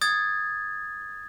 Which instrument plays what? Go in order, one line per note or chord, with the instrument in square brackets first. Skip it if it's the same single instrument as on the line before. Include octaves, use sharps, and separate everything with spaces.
[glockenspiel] D#6 G#6 A6